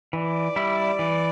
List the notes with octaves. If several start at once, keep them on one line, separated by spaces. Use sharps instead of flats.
E3 D5
G3 E4
E3